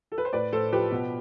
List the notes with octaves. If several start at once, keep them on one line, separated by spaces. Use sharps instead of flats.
A4
B4
C5
A2 B4 D5
A2 A4 C5
F3 G4 B4
B2